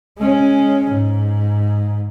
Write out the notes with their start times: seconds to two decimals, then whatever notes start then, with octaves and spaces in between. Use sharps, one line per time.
0.18 G#3 C#4
0.91 G#2